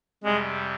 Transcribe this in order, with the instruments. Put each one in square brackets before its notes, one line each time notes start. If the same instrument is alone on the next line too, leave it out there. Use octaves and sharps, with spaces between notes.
[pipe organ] F2 C3 G3 [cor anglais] G#3